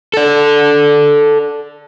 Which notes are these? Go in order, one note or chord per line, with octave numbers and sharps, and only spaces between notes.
A4 D5